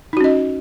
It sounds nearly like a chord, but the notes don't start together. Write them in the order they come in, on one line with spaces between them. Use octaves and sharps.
D#4 F#4 C#4 D#5